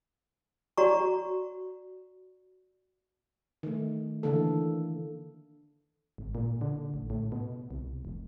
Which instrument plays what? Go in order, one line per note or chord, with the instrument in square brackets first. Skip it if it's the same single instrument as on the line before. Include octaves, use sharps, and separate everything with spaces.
[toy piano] F#4 D5 A#5 C#6
[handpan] D#3 A3
D3 E3 A#3 A4
[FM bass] G#1
A#2
D3
A1
A2
B2
C2
F1